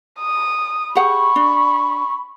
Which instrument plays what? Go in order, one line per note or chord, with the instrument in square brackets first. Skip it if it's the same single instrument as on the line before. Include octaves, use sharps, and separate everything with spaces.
[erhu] D#6
[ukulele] G4 G#4 F#5 [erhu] B5 [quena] C#6
[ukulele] D4